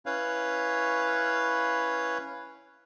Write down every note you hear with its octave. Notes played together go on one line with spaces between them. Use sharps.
C#4 E4 B4 C#5 F5